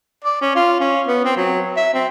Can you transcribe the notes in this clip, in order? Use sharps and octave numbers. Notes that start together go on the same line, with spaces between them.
D5
C#4
F4
C#4
B3
C4
F#3
E5
C4